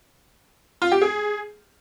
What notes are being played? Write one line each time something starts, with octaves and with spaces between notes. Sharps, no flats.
F4
G4
G#4